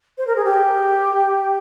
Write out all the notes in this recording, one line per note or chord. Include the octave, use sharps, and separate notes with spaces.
C5
A#4
G#4
G4